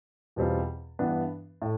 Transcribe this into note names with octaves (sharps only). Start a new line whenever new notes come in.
E2 B2 G3 C4 F4
G2 E3 B3 D4
A2